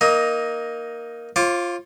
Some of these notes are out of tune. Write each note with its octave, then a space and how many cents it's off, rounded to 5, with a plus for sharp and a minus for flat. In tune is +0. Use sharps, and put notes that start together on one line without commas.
A#3 +5 D#4 +0 D#6 +35
F4 +0 C5 +45 D6 -10